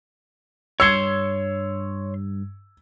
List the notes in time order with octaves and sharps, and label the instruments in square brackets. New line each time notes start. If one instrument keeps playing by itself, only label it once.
[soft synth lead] G2 [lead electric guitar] C#5 C6 [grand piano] E6 G#6 C#7